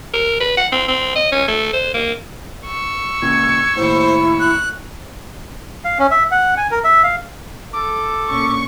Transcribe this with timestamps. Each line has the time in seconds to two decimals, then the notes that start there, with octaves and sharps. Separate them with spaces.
0.13 A#4
0.40 B4
0.57 F#5
0.72 C4
0.88 C4
1.16 D#5
1.32 C#4
1.48 A3
1.73 C5
1.94 A#3
2.66 C#6 E6
3.22 C#2 A#2 G#6
3.77 D#2 A2 E4 C5
4.40 F#6
5.84 F5
5.99 C#4
6.11 E5
6.31 F#5
6.57 G#5
6.71 A#4
6.84 E5
7.03 F5
7.73 A4 D6
8.29 A#2 C#4 C#6